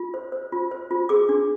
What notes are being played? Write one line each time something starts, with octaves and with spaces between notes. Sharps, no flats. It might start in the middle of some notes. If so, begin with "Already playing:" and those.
Already playing: F4
C5
C5
F4
C5
F4
G#4 D6
D4